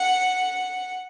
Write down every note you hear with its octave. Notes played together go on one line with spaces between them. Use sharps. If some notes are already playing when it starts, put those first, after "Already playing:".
Already playing: F#5